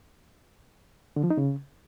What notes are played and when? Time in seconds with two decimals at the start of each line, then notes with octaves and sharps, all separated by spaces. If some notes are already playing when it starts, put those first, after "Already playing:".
1.16 D3
1.23 F3
1.30 D#4
1.37 C#3